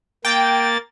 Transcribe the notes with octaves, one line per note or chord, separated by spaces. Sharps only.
A#3 G5 A6